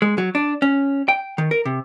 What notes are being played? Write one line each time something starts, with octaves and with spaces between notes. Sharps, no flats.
G#3
F#3
D4
C#4
G5
D#3
A#4
C3